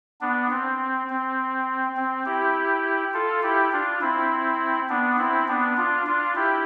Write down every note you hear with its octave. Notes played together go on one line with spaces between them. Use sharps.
B3 D4
C4
C4
C4
E4 G4
F4 A4
E4 G4
D4 F4
C4 E4
B3 D4
C4 E4
B3 D4
D4 F4
D4 F4
E4 G4